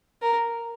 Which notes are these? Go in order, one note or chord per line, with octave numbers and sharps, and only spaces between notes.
A#4